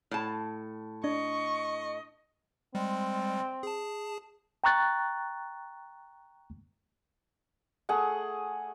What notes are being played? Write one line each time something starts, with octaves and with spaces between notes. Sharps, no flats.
A2 A5
D4 D#5 C#6
G3 G#3 C4
G#4 A5
G5 A#5 C#6 F#6 A6
A3 G#4 F#5